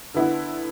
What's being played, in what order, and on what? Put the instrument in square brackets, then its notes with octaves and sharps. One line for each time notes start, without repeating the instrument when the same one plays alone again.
[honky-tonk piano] D3 B3 E4